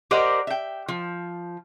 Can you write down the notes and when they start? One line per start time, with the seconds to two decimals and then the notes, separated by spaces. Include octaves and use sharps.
0.11 G4 A#4 C5 D5 D#5 F#5
0.47 E5 G5
0.88 F3